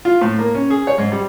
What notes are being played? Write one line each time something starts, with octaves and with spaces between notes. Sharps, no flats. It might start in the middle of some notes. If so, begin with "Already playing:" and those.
F4
A2
A#3
C#4
G#4
C#5
G#2
G3